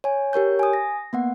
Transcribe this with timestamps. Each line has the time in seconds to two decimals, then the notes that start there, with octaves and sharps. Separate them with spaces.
0.04 C#5 G#5
0.33 G4 A#4 C#5 G6
0.59 G#5 D#6
0.73 A#6
1.13 A#3 B3 F#5